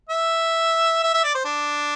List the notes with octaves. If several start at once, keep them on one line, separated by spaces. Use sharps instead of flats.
E5
E5
E5
D5
C5
D4